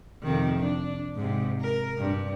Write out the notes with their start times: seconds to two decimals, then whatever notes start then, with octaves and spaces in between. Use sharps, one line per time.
0.23 F2 C3 D#3
0.59 D4
1.16 G#2 C3
1.61 A#4
1.98 G2